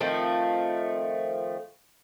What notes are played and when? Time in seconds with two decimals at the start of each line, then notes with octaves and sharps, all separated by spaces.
0.01 D#3 F3 A3 C4